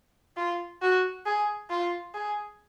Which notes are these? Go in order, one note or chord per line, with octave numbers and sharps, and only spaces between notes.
F4
F#4
G#4
F4
G#4